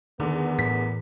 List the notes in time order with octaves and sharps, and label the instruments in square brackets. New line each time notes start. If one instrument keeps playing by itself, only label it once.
[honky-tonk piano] E2 D3 [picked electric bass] D#3 [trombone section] A3 B3 A#4
[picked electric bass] A2 E3 [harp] B6